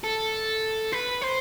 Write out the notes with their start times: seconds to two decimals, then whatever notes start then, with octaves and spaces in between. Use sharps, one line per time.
0.04 A4
0.92 B4
1.21 C5